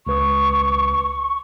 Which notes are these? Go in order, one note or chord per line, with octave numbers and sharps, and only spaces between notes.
C#2 B4 C#6 D#6